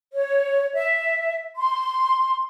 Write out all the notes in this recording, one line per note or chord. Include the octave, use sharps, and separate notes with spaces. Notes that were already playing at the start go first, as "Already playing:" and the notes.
C#5
E5
C6